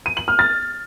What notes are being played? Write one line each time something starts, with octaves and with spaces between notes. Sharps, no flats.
D#7
F#7
F6
A6